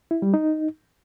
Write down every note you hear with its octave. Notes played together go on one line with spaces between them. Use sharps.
E4
G3
D#4